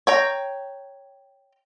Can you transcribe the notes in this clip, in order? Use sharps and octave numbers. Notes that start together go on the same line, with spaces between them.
C#5 G5 A#5